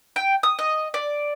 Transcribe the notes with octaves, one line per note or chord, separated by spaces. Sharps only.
G5
D#6
D#5
D5